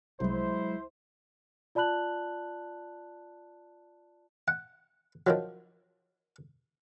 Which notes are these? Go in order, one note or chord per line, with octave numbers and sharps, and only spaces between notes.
C2 F#3 G#3 E4 C5
F4 D5 A5 B5 F#6 F#7
F#5
D#3 F3 F#3